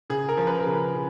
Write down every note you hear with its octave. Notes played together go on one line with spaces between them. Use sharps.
C#3 G#4
A#4
F3
B4
A#4
C#3
B4
C#3